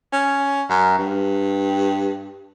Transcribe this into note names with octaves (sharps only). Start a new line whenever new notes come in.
C#4
F#2
G2